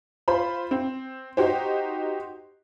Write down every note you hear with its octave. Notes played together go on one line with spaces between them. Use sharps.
F4 C5 B5
C4
D#4 F#4 G4 C5